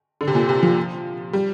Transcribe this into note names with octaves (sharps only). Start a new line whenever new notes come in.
D3
C3
A#2
C3
F3
G3